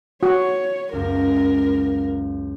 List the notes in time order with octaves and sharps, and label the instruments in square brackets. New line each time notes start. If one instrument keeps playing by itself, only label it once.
[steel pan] F#4 [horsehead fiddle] C#5
[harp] C#2 F#2 [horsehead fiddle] A#4